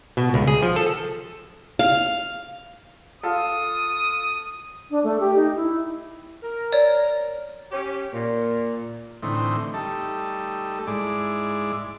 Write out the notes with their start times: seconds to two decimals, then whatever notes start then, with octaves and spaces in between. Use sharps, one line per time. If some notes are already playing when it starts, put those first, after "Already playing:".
0.17 B2
0.34 C#2
0.47 G#4
0.63 F3
0.76 A4
1.79 F5
3.23 F4 A4 D#6
4.90 D4
5.04 A3
5.20 G4
5.36 D#4
5.56 E4
6.43 A#4
6.73 C#5 D5
7.72 C#4 G4
8.13 A#2
9.23 A2 D3 E3 C4 D#4
9.74 G3 A3 D#4 A4
10.87 G#2 G#3 E4 D5 D6